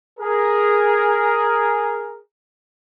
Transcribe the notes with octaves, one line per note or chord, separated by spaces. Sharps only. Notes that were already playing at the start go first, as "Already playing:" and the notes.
G#4 A#4